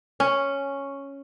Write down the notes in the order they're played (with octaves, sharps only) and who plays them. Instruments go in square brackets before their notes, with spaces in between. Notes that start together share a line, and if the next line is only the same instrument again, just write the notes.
[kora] C#4